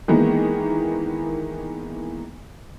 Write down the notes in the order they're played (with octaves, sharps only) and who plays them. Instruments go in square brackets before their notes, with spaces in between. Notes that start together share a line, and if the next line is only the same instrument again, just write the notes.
[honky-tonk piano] D#3 E3 G#3 A#3 B3